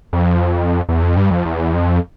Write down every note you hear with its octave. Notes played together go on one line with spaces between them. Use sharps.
F2
E2
F2
G2
F2
E2
F2